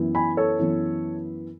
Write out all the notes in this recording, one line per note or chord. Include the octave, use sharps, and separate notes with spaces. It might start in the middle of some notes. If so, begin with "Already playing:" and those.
Already playing: F#2 E3 B3 E4
G#5 B5
A4 C#5
F#2 E3 B3 E4